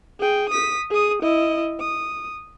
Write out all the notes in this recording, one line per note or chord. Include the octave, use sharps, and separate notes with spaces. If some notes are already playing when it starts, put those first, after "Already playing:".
G#4 G5
D#6 B6
G#4 D#6
E4 D#5
D#6